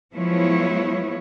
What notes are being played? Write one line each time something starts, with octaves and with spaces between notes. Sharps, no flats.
F3 F#3 G#3 B3 E4 C#5